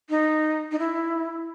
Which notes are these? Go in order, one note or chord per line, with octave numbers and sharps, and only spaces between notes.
D#4
D#4
E4